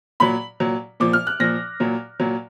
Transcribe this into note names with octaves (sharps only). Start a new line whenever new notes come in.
A#2 F#3 B5
A#2 F#3
A#2 F3 D6
F6
F#6
A#2 F3 A#6
A#2 F#3
A#2 F#3